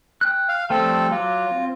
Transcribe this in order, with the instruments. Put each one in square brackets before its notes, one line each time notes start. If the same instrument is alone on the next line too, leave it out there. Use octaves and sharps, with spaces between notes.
[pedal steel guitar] G5 F#6
[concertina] F5
[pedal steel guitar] F3 G3 A3 [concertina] C4 A4
[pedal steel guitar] F#3 D6 [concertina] F4
[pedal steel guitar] C4